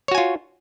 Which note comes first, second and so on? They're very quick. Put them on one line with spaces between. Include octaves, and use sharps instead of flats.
C#5 F#4 G#5 F4